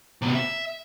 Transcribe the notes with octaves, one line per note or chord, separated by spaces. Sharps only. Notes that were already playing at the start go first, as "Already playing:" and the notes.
C3 B3
E5